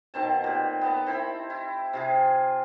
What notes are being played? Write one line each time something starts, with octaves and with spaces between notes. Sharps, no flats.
B2 D#3 C4 A5
A#2 G4
B3 A4 A#5
C4 E4 B5
E4
C3 F4 G#4